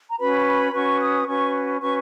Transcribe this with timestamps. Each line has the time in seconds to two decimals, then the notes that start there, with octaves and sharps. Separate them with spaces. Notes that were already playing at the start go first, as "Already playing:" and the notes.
0.09 A#5
0.19 C#4 F#4 B4 B5
0.46 B5
0.73 C#4 F#4 B4 C#6
1.00 D#6
1.27 C#4 F#4 B4 C#6
1.81 C#4 F#4 B4 C#6